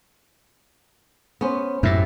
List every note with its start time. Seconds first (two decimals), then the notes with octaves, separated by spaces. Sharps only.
1.41 B3 C#4 C5
1.83 F#2 A2 E4 G4